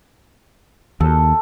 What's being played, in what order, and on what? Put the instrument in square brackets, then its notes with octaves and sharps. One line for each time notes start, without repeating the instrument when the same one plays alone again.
[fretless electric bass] D#2 [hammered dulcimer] A4